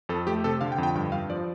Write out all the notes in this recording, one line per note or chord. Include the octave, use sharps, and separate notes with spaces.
F2 A4
A3 G4
C3 A4
D3 F5
G5
F2
G5
G2 G5
G2 F5
F3 D5